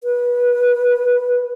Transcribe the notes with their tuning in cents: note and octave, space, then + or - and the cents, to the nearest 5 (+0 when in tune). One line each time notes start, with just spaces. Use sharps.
B4 -25